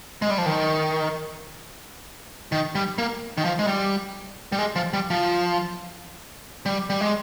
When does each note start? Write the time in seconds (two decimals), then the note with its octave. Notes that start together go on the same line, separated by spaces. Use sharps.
0.22 G#3
0.30 G3
0.38 F3
0.46 D#3
2.52 D#3
2.75 G3
2.98 A#3
3.37 D#3
3.45 F3
3.59 G#3
3.67 G3
4.52 G3
4.58 G#3
4.76 F3
4.93 G3
5.10 F3
6.66 G3
6.90 G3
7.01 G#3